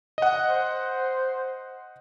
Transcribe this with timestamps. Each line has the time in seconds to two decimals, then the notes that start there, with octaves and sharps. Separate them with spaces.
0.18 D#5 F#5
0.49 C5